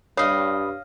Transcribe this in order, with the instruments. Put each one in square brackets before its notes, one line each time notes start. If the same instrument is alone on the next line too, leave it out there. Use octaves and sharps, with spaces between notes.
[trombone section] G2 [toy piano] C#5 [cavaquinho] D#5 F5 [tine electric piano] B5 D#6 C7